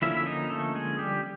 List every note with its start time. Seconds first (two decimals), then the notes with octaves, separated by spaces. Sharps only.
0.02 D3 F3 A#3 C#4 E4 E5
0.17 E5
0.26 D#4 D#5
0.50 A3 A4
0.75 G#3 G#4
0.99 G3 G4